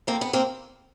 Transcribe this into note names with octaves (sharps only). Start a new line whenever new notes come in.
F2 A#3 C4
B3
A#3 C4